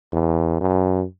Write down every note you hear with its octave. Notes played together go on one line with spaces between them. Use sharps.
E2
F#2